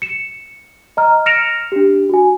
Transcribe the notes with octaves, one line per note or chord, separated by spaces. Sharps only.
C#7 E7
D#5 A#5 F6
F6 A#6 C#7 D7 E7 F7
D4 G4
F#4 G#5